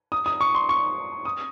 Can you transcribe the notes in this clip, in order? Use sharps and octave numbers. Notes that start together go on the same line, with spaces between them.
D#6
D#6
C#6
C6
C#6
D#6